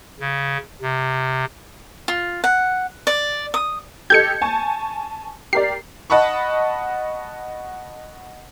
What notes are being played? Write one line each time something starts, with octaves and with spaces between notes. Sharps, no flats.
C#3
C3
F4
F#5
D5
D#6
G4 A4 D#5 G6 G#6 C#7
G#5 A5 C#6
G4 A#4 D5 C7
D#5 F#5 A5 B5 C#6